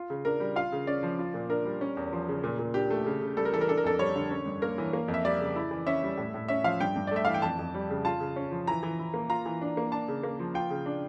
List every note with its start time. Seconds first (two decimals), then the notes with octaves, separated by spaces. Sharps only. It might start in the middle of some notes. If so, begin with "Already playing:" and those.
Already playing: F4
0.10 C#3
0.25 D4 A#4
0.40 G3
0.56 F4 F5
0.72 C#3
0.87 C#4 D5
1.03 F3
1.19 F4
1.34 A#2
1.50 D4 A#4
1.65 G3
1.81 C#4
1.97 E2
2.12 F3
2.28 C#3
2.44 A#2
2.59 A#2
2.74 D4 G4
2.90 A3
3.06 C#3
3.22 C#3
3.37 G3 A4
3.45 A#4
3.53 E3 A4
3.61 A#4
3.68 D4 A4
3.77 A#4
3.84 F2 A4
3.99 G3 C#5
4.16 D3
4.31 C#4
4.46 G2
4.62 A#3 A#4
4.78 E3
4.93 A#3
5.08 F2
5.14 E5
5.25 G3 D5
5.40 C#3
5.56 E4
5.71 E3
5.87 C#4 E5
6.03 G3
6.17 A2
6.34 A2
6.48 C#4 E5
6.64 F3 F5
6.80 G2 G5
6.96 G2
7.07 D5
7.11 A3 E5
7.25 E3 F5
7.34 G5
7.42 F2 A5
7.59 F2
7.74 G3
7.90 C#3
8.05 F4 A5
8.20 C#3
8.36 C#4
8.51 F3
8.67 E3 A#5
8.83 E3
8.99 E4
9.14 A#3
9.29 F4 A#5
9.46 E3
9.61 D4
9.77 A#3
9.92 D4 A5
10.08 C#3
10.23 A#3
10.39 F3
10.54 F4 G5
10.70 C#3
10.86 D4